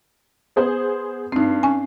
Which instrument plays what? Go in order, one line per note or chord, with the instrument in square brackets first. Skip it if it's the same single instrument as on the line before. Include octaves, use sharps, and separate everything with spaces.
[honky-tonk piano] B3 G#4 C5
[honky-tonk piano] G2 C7 [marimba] C4 D#4
[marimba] C#4 G#5